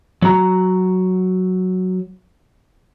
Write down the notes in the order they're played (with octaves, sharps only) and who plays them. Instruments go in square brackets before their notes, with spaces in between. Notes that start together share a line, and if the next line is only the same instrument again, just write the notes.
[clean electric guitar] F#3 F#4 A#5